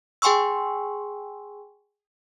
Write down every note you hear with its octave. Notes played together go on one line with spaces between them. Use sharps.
G#4 G5 G#5 C6 C#6 E6